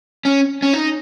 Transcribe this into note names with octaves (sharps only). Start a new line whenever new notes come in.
C#4
C#4
D#4